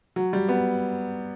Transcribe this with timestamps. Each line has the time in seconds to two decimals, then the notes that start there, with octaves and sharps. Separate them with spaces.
0.16 F#3
0.33 G3
0.49 B3